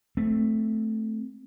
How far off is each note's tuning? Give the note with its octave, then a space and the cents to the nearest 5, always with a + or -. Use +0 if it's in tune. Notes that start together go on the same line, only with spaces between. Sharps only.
A3 +0 C4 +0